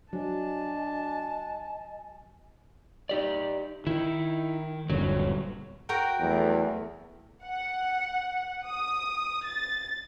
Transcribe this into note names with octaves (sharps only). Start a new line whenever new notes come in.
F#3 D4 D#5 G#5 A5
D#4 G4 D5
D#3 D#4 E4
D#1 G2 D3 F#3
F#4 A#4 G5
E2 F#3 A3
F#5
D#6
A6